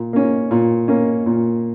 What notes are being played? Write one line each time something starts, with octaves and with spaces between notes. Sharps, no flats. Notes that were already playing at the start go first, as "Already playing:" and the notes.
Already playing: A#2
A#3 C#4
A#2
A#3 C#4
A#2